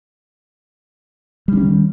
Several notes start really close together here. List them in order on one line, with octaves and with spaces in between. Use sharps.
G3 D4 C#4 D#3